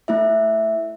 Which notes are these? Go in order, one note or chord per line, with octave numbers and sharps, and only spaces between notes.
A3 E4 E5